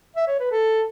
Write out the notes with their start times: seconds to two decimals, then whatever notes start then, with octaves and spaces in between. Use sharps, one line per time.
0.16 E5
0.28 C#5
0.39 B4
0.51 A4